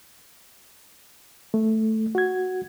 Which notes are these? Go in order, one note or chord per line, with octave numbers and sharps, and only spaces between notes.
A3
F#4 G#6